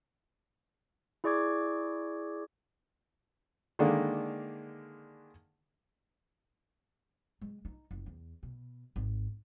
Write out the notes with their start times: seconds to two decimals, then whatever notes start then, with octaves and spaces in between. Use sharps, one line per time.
1.24 E4 G#4 D5 C#6 D6 G#6
3.79 D3 D#3 G#3 A#3 D4
7.41 G#3
7.65 D#4
7.91 F#1
8.06 E2
8.43 B2
8.96 G#1